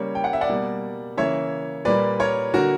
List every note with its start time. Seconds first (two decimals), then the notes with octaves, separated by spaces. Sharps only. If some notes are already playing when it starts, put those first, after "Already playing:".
Already playing: C#3 G3 A#3 C#5
0.15 G5
0.24 F#5
0.33 E5
0.41 D5 F#5
0.49 B2 G3 A#3
1.17 C#3 E3 A#3 C#5 E5
1.85 A#2 G3 A#3 B4 D5
2.20 A#4 C#5
2.54 D3 A#3 F#4 A#4